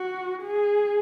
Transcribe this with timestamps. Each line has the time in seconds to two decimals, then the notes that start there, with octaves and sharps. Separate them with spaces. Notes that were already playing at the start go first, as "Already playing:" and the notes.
Already playing: F#4
0.43 G#4